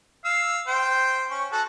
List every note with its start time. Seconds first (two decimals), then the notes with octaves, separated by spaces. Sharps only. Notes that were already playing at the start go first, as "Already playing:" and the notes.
0.25 F5 E6
0.67 C5 G5
1.31 C#4 C#6
1.52 F#4 A4 F#5